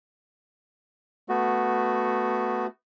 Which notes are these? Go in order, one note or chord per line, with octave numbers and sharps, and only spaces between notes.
A3 B3 F#4